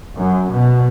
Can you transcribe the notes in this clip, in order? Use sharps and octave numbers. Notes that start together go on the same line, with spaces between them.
F#2
B2